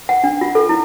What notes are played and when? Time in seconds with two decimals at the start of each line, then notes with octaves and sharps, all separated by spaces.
0.09 F#5
0.24 D4
0.41 F4
0.55 A4
0.69 E4